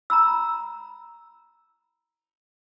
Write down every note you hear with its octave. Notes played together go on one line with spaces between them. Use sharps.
A#5 B5 E6